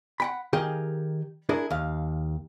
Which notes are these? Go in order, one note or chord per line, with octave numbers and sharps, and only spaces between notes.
F#5 G5 B5
D#3 G4 G#4 A#4 F5 G5
D4 E4 G#4 A#4
D#2 F5